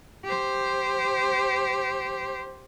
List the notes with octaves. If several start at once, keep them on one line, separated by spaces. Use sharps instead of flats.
G4 C5